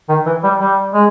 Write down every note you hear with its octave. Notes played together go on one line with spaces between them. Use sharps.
D#3
E3
G3
G3
G#3